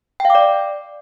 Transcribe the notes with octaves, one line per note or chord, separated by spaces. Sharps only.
D5 F5 G5 D6